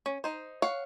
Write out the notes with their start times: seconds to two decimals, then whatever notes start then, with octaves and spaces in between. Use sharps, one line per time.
0.06 C#4
0.24 D#4 C5
0.62 C#5 F5 F#5